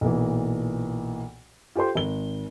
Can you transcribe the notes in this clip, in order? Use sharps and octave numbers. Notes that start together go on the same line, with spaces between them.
B1 A#2 E3
F4 G4 A4 C5 C6
G#1 G7